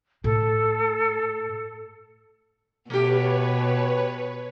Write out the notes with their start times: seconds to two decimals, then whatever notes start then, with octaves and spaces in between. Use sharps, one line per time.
0.24 A2 A4
2.90 B2 A3 G4 B4 C#5